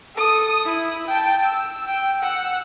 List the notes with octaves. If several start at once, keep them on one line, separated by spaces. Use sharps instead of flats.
A4 D#6
E4
G5 A5
E6
G5
F#5 E6